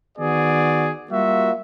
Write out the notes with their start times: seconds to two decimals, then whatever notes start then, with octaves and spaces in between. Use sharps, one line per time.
0.18 D#3 B3 F#4 G#4 D5
1.10 G3 A#3 F4 F#4 E5